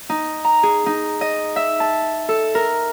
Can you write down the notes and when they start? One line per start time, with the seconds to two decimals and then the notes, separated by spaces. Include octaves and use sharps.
0.10 D#4
0.45 A#5
0.63 G#4
0.86 D#4
1.21 D#5
1.56 E5
1.80 A5
2.29 A4
2.55 A#4